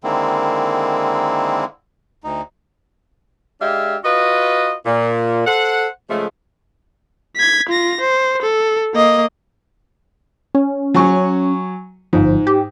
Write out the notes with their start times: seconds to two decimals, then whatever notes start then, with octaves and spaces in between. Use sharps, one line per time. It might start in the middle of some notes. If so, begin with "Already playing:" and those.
0.04 D3 D#3 G#3 A#3 C4 E4
2.24 D2 D#4
3.60 G#3 D4 G4 E5 F5
4.04 F4 F#4 B4 D#5
4.85 A#2
5.46 A4 C5 F#5
6.09 C#3 F3 G#3 A3
7.36 G#6 B6
7.69 F4 A#6
8.01 C5
8.42 A4
8.94 A#3 D#5
10.55 C#4
10.94 F#3 G#5 C#6
12.13 G1 G#2 F3
12.47 G4